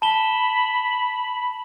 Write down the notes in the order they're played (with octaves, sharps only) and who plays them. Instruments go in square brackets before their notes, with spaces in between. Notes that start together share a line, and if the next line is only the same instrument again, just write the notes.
[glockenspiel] A5 E7 G7 [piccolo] B5